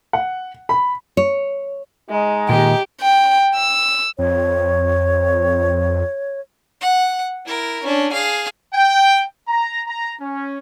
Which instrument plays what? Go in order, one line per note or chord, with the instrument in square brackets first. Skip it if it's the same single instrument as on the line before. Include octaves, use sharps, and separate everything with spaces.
[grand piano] F#5
B5
[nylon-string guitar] C#5
[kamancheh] G#3 [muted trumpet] D#4
[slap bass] A#2 D#3 [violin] G4
[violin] G5
E6
[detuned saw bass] F2 [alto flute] C#5
[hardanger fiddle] F#5
E4 A#4
C#4 D4
G#4 F5
[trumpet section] G5
A#5
A#5
C#4